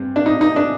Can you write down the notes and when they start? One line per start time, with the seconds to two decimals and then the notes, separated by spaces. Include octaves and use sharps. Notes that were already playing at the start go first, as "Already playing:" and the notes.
Already playing: G2 C4
0.16 D4
0.26 D#4
0.41 D#4
0.56 D4